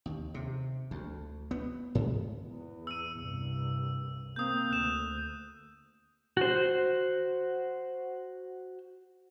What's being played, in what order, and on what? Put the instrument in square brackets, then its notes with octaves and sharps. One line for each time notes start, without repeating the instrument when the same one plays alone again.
[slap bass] D#2
C3
D2
B3
G#2
[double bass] E2
[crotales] E6 D#7
[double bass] C2 G2
[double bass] A#3 C4 [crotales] D#6 G6
[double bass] D2 [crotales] F#6 E7
[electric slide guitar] F#4 C5